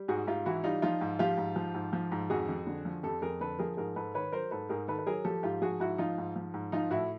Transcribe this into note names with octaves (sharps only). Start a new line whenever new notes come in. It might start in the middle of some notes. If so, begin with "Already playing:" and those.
Already playing: G3
G#2 F#4 G#4
G#2 F4 G4
E3 E4 F#4
G3 D#4 F4
F3 D#4 F4
G#2
F3 F4 G4
G#2
F3
G#2
F3
G#2
F2 F#4 G#4
F2
D3
F3
F2 G4 A4
F2 G#4 A#4
D3 A4 B4
F3 G#4 A#4
G#2 G#4 A#4
G#2 A4 B4
D#3 B4 C#5
F#3 A#4 C5
G#2 A4 B4
G#2 G#4 A#4
D#3 A4 B4
B4
F#3 G#4 A#4
F3 G4 A4
G#2 F4 G4
F3 F#4 G#4
G#2 E4 F#4
F3 D#4 F4
G#2
F3
G#2
F3 D#4 F4
A2 E4 F#4